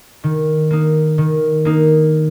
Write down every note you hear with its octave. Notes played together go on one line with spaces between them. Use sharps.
D#3
A#3 D#4
D#3
A#3 D#4